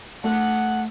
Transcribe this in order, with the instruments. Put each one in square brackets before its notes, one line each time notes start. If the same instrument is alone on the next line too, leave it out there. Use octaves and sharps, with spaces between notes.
[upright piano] A3 [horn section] F#5